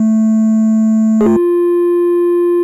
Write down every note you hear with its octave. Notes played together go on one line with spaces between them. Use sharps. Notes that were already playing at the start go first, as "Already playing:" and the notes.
Already playing: A3
G#4
F4